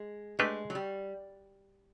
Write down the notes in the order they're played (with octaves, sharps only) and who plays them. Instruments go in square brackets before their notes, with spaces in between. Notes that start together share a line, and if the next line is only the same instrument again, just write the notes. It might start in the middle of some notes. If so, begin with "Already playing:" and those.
Already playing: [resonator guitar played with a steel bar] G#3
[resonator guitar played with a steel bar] G#3 [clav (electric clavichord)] A3 D4 G4 B4
[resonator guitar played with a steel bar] F#3
G3